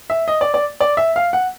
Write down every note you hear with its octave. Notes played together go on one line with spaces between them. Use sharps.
E5
D#5
D5
D5
D5
E5
F5
F#5